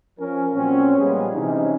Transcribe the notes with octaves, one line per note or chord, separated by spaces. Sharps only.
F3 C#4 A#4
A#2 F#3 C4 C#4
A#2 F3 G3 G#3 B3 G#4
C3 E3 C#4 D#4